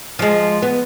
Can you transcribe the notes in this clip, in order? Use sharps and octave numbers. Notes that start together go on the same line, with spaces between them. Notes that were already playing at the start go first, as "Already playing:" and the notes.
F3 G#3
B3